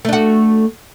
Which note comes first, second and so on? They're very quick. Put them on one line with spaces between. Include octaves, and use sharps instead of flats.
A3 D4 F#4